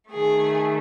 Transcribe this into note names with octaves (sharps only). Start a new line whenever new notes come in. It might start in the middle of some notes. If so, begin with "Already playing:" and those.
D#3 A3 G#4